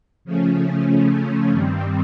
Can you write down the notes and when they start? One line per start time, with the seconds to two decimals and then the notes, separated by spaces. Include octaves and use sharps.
0.25 C#3 F3 A3 C#4
1.51 G2 D#3 G3 C4